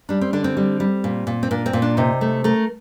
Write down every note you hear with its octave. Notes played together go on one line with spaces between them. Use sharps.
G3 D4
C4
D3 D4
C4
G3
G3
A#2
A#2
C4
A#2 D4
C4
A#2
D4
C3 D#4
A3
A3 A#4